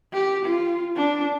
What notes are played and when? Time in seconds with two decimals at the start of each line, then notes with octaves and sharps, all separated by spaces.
0.13 G4
0.45 F4
0.96 D4